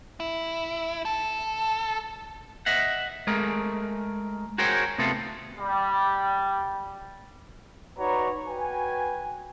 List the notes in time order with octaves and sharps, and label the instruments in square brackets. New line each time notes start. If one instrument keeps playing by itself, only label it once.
[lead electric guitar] E4
A4
[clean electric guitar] D#5 E5 F#5
G#3 A3 G#4 A#4
F#4 G#4 A#4 C5 C#5 G5
C3 A3 B3 F4 A4
[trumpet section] G3
D#4 F#4 B4 C#5 D5 A#5
F#4 B4 G5 G#5